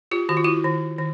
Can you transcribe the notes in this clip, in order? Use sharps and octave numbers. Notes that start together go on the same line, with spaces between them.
F4 G4
D#3 F#4
F4
E4 F#4
D#3
D#3